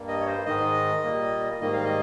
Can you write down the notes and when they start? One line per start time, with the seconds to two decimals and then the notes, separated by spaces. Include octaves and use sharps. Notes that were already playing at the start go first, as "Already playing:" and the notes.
Already playing: G2 G3 A#3
0.08 D#5
0.21 C#5
0.27 C5
0.46 G#2 D#3 G#3 D#5
1.03 A#2 G3 A#3
1.60 G#2 D#3 G3 A#3 D#5
1.73 F5
1.85 D#5